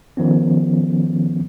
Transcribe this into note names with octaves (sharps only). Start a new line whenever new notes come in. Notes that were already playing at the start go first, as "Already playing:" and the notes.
D#3 F3 B3 C#4